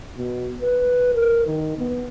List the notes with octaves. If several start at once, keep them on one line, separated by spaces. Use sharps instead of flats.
B2
B4
A#4
D#3
B3